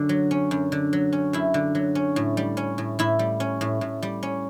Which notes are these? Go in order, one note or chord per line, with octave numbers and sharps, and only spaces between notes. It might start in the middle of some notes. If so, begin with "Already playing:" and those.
Already playing: F#2 D3 C#4
F#3
C#4
F#2
D3
F#3
C#4
F#2 E4
D3
F#3
C#4
A2
G3
C#4
A2
A2 E4
G3
C#4
A2
A2
G3
C#4